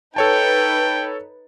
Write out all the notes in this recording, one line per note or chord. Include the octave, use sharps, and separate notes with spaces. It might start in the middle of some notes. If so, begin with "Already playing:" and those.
D#4 A4 B4 C#5 G5 A5